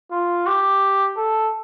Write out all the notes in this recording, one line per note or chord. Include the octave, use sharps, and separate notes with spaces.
F4
G4
A4